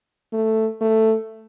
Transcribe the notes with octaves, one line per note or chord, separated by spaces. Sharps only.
A3
A3